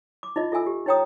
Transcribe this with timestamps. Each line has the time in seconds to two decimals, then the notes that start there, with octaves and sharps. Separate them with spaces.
0.23 D6
0.36 D#4 F4 D#5
0.52 F4 A4 E5 G#5 E6
0.67 G4
0.86 D#4 B4 C#5 G5 A#5 D#6